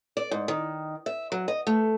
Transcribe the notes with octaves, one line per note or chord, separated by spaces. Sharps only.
D5
G#2
D#3
E5
F#3
D#5
A3